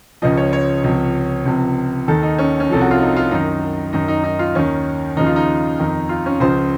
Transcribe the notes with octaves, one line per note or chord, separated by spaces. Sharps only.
C#2 C#3 F3 D#5
C#5
C#5
C#2 C3 F3
C#2 C3 F3
D#2 D#3 A4
D#4
C#4
C#4
C2 C3 F3 A4
F#4
F4
D#4
F4
F#2 D#3 D#4
F#2 D#3 D#4
D#4
D#4
F4
D#2 D#3 C#4
D#2 C#3 F3 D#4
F4
D#4
F2 D#3
F4
C#4
C#2 C#3 F3 C5